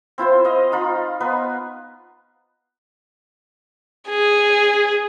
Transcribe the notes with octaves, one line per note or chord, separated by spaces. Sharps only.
C4 E4 F4 C5
D#5 F5
D#4 F4 B5
B3 D#4 B4 G#5
G#4